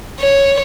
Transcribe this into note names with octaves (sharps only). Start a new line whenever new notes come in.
C#5